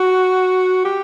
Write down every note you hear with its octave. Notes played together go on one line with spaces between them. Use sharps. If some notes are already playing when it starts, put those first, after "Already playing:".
Already playing: F#4
G4